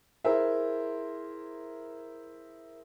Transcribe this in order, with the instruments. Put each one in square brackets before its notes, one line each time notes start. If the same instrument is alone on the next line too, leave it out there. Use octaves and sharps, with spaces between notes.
[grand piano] E4 G#4 A#4 C5 E5